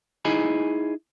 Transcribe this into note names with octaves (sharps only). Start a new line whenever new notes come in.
D#4 E4 G#4 D#5 G#5 B5